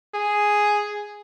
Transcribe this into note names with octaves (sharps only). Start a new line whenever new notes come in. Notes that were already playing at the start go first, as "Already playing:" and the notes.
G#4